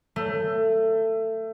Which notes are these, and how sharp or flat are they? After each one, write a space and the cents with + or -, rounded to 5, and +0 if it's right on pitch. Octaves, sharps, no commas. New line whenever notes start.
A3 +20